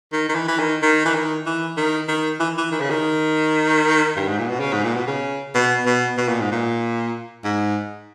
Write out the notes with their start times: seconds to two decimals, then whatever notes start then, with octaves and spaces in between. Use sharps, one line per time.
0.13 D#3
0.29 D#3
0.35 E3
0.48 E3
0.59 D#3
0.82 D#3
1.05 E3
1.15 D#3
1.46 E3
1.77 D#3
2.08 D#3
2.40 E3
2.58 E3
2.72 D#3
2.80 C#3
2.90 D#3
4.17 G2
4.28 G#2
4.39 A#2
4.49 B2
4.60 C#3
4.73 G#2
4.84 A#2
4.96 B2
5.07 C#3
5.55 B2
5.86 B2
6.17 B2
6.28 A#2
6.40 G#2
6.52 A#2
7.44 G#2